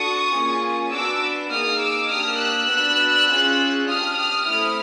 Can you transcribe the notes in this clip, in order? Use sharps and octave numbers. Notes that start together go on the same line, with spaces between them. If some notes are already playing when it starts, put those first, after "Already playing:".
Already playing: D4 F#4 A4 C#6 D#6
A#3 C#4 F4 G#4
B3 D4 F#4 D6 E6
A#3 D#4 G#4 D#6 F6
D6 E6
A#3 D4 G4 D#6 F6
E6 F#6
B3 D4 F#4
C#4 F4 G#4
D4 G4 D#6 F6
D#6 F6
A3 C4 E4 D#6 F6